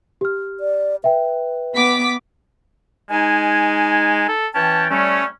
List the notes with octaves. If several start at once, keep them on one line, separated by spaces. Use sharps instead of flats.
G4 F6
D5
B4 E5 G5
B3 D6 B6
G#3 D#4 G#5
A4
E3 C#4 G5 A5
G3 A3 C#4